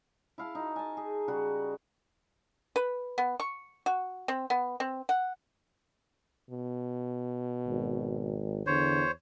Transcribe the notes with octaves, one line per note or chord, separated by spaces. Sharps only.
E4 F5 A5
D#4 F#4
G#5 A5
G#4
C#3 G3 F#4
B4
B3
C#6
F#4
C4
B3
C4
F#5
B2
G#1
E2 D3 C5 C#5